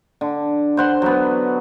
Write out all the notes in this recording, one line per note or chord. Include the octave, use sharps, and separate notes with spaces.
D3
C5 F#5 C6
F#3 B3